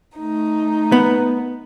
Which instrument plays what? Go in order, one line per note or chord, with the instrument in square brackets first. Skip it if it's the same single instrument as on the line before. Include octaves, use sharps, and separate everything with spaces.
[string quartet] A3 D#4
[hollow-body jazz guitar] B3